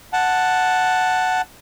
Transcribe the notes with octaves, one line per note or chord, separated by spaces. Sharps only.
F#5 A5